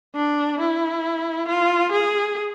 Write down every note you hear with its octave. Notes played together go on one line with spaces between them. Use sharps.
D4
E4
F4
G#4